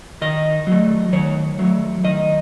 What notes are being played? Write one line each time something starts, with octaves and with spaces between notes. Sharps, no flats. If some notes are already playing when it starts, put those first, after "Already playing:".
D#3 D#5
F#3 A3
D#3 C#5
F#3 A3
D#3 D#5